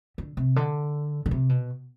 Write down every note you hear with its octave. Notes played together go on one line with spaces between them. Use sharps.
D3
C3
D3
D3
C3
B2